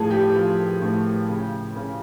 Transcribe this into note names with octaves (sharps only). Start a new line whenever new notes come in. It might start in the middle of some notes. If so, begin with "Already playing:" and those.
Already playing: A2 F3 G#4 A4
G4
F3
A2
C#3
C#3